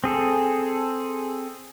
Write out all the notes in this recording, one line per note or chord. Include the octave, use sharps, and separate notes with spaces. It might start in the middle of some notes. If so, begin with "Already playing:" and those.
C4 G#4 A4